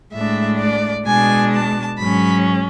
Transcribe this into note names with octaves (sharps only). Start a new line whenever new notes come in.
A2 G#3 D4 E5
D5
B2 G#3 D4 G#5
A5
G#2 F#3 C#4 B5